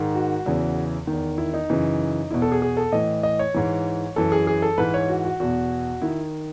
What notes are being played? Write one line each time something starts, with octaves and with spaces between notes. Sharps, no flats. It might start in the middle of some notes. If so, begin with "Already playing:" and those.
Already playing: G#2 D#3
F#4
E2 C#3 E3
E2 D#3
E4
D#4
F#2 C#3 E3
E2 B2 E4
A4
G#4
G#4
A4
A2 E3 D#5
D#5
C#5
G#2 E3
F#2 E3 A4
G#4
G#4
A4
G#2 E3 B4
C#5
F#4
F#4
E2 B2 F#4
D#3 E4